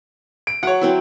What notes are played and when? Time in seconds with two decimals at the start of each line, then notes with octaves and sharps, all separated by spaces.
0.47 D7
0.63 F#3 C#5 F#5
0.81 F#3 C4 E4